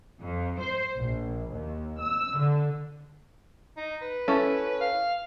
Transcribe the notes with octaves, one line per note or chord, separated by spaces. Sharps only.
F2
C5
A#1
D#2
E6
D3
D#4
B4
C#4 E4 A4
F5